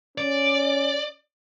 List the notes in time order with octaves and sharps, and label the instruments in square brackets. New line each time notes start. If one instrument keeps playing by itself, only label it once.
[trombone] C#4 [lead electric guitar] D5